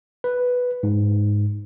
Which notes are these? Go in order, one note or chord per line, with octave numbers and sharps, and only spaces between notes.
B4
G#2